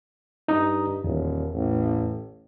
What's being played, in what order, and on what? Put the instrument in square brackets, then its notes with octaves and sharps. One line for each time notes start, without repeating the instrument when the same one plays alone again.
[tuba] G2 [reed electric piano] D#4 A#5 D#6
[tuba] D#1 [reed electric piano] E2
[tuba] A1